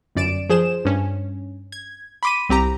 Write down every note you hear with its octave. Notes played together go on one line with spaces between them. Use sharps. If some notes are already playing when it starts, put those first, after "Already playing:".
G1 F#2 D5 D7 E7
F3 G#4 C5 E7
G2 C#4
G#6
B5 C6 D6 B6 D#7
C2 C4 G4 A#5